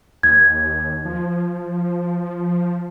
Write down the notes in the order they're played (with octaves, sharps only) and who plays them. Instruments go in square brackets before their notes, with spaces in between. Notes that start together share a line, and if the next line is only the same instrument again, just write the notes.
[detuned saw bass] D#2 [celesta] G#6
[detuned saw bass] F3